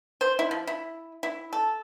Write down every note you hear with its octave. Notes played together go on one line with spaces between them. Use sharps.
C5
E4
F3
E4
E4
A4